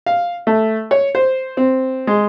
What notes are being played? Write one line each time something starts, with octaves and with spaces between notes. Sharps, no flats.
F5
A3
C#5
C5
C4
G#3